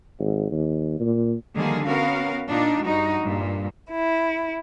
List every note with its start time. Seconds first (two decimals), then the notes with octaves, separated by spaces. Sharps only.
0.19 G#1
0.51 D#2
1.00 A#2
1.54 D3 D#3 F3 G3 A#3 G#4
1.86 B3 C#4 F#4 A#4 F5
2.48 A#2 D4 D#4 F4
2.84 G2 G3 D#4 F#4
3.22 G2 A#2
3.91 E4